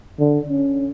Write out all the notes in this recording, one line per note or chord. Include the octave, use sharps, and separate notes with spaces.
D3
C#4